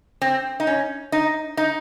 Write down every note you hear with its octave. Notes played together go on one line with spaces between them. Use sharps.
C4
D#4
C#4
D#4
D#4